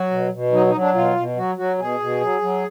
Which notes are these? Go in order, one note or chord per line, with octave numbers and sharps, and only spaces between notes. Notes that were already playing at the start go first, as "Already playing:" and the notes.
Already playing: F#3 F#4
B2
B2
F#3 D#4
D#4
F#3
D4
B2 F4
B2
F#3 F#4
F#3 F#4
B2 G#4
B2
F#3
F#3